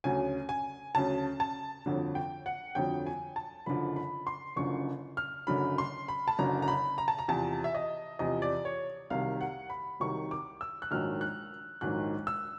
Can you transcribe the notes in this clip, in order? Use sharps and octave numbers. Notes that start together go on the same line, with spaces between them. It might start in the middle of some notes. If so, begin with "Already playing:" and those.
D2 C#3 F#3 G#5
G#5
D2 C#3 F#3 A5
A5
G1 F2 D3 F#3
G5
F#5
G1 F2 D3 F#3 G5
G#5
A5
F#1 F#2 D3 F3 B5
B5
C6
F#1 F#2 D3 F3 C#6
F6
F#1 F#2 D3 F#3 B5
C6
B5
A5
F#1 F#2 D3 F#3 A#5
A#5
B5
A#5
A5
A#5
E2 C3 F3 A5
E5
D#5
E2 C3 F3 D#5
D5
C#5
C2 C3 D#3 F#3 F5
F#5
B5
C2 C3 D#3 F#3 C#6
D6
E6
F#6
A#1 G#2 D#3 F#3 F6
F#6
A#1 G#2 D#3 F#3 F#6
E6